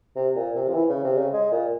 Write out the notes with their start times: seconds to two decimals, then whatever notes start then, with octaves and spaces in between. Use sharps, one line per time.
0.16 C3
0.35 A#2
0.55 C3
0.68 F3
0.74 E3
0.89 C#3
1.04 C3
1.17 C#3
1.33 G#3
1.52 A#2